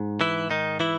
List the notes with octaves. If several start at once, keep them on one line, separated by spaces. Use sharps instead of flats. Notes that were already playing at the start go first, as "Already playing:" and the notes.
Already playing: G#2
E3 E4
D#3 D#4
E3 E4